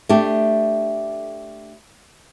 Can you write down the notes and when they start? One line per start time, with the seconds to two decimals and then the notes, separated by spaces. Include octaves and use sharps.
0.09 A3 D4 G4